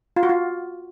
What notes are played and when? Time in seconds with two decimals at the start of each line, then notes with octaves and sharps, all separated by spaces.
0.16 F4
0.23 F#4
0.29 F4